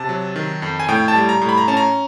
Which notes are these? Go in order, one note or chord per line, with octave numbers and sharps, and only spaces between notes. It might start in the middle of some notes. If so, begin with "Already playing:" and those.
Already playing: C3 A5
F#3
D#3
F2
G#5
A2 G5
A5
G3
A#5
A2
B5
A#5
C#4 A5
A#5